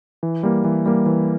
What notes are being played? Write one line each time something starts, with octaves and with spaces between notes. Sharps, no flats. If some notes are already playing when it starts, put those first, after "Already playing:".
E3
G3 A#3
E3
G3 A#3
E3